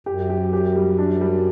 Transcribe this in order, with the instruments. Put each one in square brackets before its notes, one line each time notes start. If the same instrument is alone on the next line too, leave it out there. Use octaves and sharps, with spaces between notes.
[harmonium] F#2 [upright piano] G4
[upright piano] G4
G4
G3
D4
G3